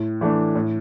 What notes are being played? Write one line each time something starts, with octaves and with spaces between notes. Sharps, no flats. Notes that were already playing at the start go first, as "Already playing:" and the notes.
Already playing: A2
E3 A3 D4
A2